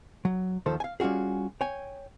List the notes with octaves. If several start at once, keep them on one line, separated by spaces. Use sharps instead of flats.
F#3
D#2 D#3 F3 A4 C5
F5 G#5
G3 C#4 F4 F#4 G#4
C#5 G5 G#5